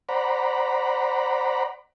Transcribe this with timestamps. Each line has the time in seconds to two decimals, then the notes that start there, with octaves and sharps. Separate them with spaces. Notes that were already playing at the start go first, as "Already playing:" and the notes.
0.09 C5 D5 F#5 A#5 B5